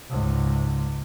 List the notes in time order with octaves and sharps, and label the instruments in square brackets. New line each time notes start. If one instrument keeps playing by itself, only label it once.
[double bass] C#2 G#2